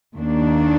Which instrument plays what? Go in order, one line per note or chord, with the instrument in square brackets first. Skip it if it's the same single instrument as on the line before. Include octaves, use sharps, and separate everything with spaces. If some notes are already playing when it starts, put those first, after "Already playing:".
[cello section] D#2 D#3 A#3 D4